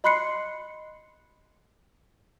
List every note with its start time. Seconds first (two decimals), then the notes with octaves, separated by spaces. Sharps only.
0.04 D#5 B5 C6 F#6 C7 C#7